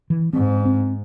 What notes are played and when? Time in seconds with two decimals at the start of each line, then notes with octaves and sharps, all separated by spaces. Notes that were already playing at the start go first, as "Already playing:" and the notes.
0.10 E3
0.33 G#2 C4
0.65 C4